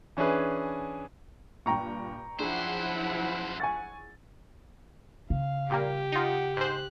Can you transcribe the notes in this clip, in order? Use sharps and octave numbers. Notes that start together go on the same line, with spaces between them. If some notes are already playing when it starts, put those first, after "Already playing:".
E3 C#4 D4 G#4 B4
G2 A#2 G5 A#5 C#6
F#2 F3 D4 E4 G#4 C5 F#5
G#5 C#6 A6
C#3 F5
A#2 G3 A#3 G4
D#4 F4 F#5
G#2 C5 F#6